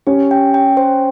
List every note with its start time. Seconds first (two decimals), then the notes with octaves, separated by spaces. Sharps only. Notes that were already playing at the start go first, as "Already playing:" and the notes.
0.07 C#4 G4
0.31 G5
0.54 G5
0.77 C5